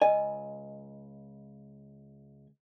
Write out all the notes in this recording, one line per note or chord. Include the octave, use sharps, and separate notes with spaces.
C#2 D#5 G#5